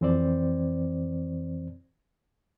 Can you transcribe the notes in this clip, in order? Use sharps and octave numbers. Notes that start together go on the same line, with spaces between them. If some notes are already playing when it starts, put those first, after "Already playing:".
F2 E3 C4 C5 D5